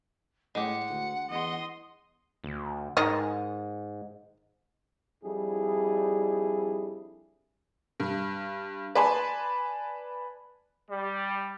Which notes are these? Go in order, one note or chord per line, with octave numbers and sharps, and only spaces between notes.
A2 G#3 G4 F#5
D2
E2 D#5 C6
D2
G#2 D#3 D#5
F2 G3 D4 E4 G#4 A4
G2
B4 D5 G#5 A5 C6
G3